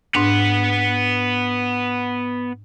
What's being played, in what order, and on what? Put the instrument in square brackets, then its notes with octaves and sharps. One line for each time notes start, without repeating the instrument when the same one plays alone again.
[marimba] G#2 D4 [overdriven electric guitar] B3 F#5